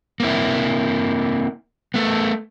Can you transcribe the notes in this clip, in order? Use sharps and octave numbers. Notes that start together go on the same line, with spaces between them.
A#3 C4 E4
A3 B3